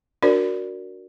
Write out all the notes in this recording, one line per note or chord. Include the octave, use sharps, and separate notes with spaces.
D4 F#4 A#4 C5 D5